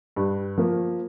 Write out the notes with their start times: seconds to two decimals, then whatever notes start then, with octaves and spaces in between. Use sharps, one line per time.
0.16 G2
0.58 F3 A#3